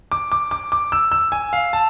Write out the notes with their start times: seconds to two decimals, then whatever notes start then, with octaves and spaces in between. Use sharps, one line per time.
0.12 D6
0.32 D6
0.51 D6
0.72 D6
0.92 E6
1.12 E6
1.32 G#5
1.53 F5
1.73 A5